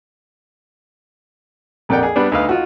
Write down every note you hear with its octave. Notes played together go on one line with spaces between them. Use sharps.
A#1 F2 A#4 D5 F#5 G5
G#4
G3 B3 D4 B4
D2 D#4 B4 F5 F6
D#4 F4 F#4